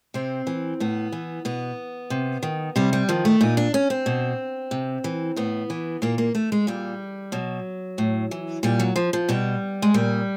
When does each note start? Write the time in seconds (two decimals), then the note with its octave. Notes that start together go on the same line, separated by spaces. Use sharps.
0.14 C3 C4
0.47 E3
0.80 A2 B3
1.12 E3
1.45 B2 B3
2.10 C3
2.43 D#3
2.76 C3 G3
2.93 G3
3.09 D#3 F3
3.25 A3
3.41 A#2 D#4
3.57 D4
3.74 C#4
3.90 C4
4.06 B2
4.71 C3
5.04 E3
5.36 A2 B3
5.70 E3
6.02 A#2 A#3
6.18 A#3
6.35 A3
6.52 G#3
6.67 A#2 G3
7.32 B2 F#3
7.98 A2
8.31 E3
8.63 A#2 G3
8.79 F#3
8.96 F3
9.13 F3
9.29 B2 G3
9.82 G#3
9.94 A#2 G3